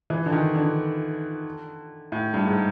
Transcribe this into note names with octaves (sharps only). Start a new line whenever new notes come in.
E3
D3
D#3
D3
A2
G2
G#2